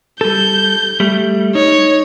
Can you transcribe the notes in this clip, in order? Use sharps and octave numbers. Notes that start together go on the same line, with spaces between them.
G3 A4 G6
G3 A3
D#4 C#5